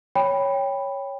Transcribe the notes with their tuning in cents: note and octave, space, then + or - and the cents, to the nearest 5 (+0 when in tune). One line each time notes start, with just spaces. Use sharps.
C#5 +0 G5 +15 B5 +0